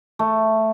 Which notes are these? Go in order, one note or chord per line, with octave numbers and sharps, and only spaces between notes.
A3